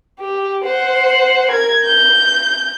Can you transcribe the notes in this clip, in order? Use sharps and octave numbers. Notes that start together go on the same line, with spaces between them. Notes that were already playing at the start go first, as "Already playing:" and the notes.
G4
C5 F#5
A#4 G#6
G6